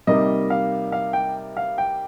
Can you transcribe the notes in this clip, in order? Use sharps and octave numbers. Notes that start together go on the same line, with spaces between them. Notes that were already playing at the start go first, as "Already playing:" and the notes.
C3 G3 A#3 D#4 D#5
F5
F5
G5
F5
G5